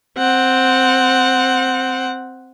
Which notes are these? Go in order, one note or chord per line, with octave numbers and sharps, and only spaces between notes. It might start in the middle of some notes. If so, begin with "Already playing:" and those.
C4 F#5